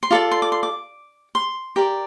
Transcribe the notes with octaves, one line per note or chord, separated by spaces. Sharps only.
C6
F4 A4 D5 D6
C6
D6
C6
D6
C6
G4 A#4 D5